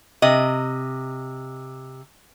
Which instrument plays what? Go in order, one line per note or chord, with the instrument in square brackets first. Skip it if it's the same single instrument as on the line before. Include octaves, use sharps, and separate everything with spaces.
[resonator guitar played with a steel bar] C3 D#5